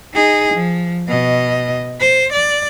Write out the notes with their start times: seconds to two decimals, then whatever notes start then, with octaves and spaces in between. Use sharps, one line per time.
0.14 D#4 G#4
0.54 F3
1.09 B2 D#5
2.00 C5
2.33 D5